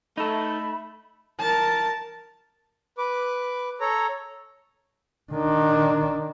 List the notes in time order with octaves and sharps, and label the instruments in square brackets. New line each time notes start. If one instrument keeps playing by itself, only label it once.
[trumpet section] A3 [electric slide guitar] D#4 A4 [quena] B5
[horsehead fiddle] A#4 A5
[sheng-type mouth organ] B4 D6
A4 C#5 A#5
[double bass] D#3 D4